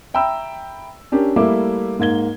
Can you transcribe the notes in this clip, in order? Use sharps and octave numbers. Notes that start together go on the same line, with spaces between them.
E5 G5 A#5 B5 E6
C#4 D4 G4 A#4
G3 A3 A#3 E4 E5 D6
G#2 A#3 G#6 G7